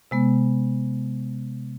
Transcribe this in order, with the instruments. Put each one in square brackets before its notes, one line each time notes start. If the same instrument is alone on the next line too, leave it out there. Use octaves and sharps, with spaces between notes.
[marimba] C3 G#3 B3